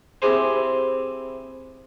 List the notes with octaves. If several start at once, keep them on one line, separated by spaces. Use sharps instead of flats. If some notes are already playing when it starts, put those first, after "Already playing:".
C4 E4 G4 G#4 C5